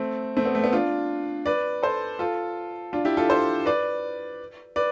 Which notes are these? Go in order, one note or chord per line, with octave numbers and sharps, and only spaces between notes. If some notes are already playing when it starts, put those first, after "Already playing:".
Already playing: A3 C4
A3 C4
B3
A3
B3
D4 F4
B4 D5
A4 C5
F4 A4
D4 F4
E4 G4
F4 A4
A4 C5
B4 D5
B4 D5